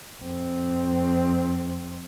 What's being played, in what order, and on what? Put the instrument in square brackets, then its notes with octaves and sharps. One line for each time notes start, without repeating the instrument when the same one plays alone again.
[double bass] F2 C4